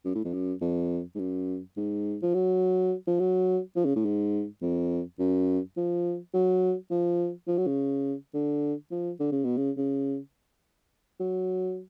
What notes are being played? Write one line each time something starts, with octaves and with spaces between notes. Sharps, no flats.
F#2
A2
F2
F#2
F2
G#2
F#2
G#2
F3
F#3
F3
F#3
F3
C#3
A2
G#2
F2
F#2
F3
F#3
F3
F3
F#3
C#3
D3
F3
D3
C#3
B2
C#3
C#3
F#3